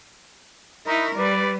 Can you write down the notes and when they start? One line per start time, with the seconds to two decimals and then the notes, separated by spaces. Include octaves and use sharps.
0.86 D#4 E4 A#4 B5 C#6
1.16 G3 B4 D5